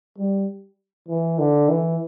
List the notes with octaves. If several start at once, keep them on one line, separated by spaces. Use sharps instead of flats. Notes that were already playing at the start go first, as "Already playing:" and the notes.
G3
E3
D3
E3